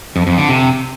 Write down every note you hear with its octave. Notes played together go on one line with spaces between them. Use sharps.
F2
F2
D3
C3